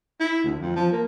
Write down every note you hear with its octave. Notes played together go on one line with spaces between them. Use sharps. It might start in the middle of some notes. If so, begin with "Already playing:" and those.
E4
D2
F2
F3
A#3